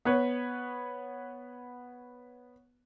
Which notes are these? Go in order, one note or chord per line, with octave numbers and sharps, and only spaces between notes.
B3 B4 C#5